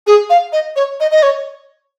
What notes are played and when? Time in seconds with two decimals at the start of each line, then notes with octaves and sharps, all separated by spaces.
0.07 G#4
0.30 F5
0.53 D#5
0.76 C#5
1.00 D#5
1.11 D#5
1.23 C#5